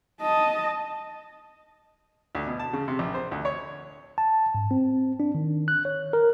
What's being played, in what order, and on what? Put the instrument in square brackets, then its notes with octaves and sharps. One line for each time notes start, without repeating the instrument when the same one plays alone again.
[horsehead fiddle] D#5 A5
[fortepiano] D2
B2
A5
C#3
C3
A#1
C5
D2
C#5
[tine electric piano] A5
G#2
C4
D4
D#3
F#6
C#5
A#4